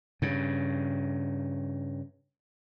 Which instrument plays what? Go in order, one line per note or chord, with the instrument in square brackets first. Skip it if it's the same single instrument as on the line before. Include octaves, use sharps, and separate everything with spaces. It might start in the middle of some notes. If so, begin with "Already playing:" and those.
[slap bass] G2 C#3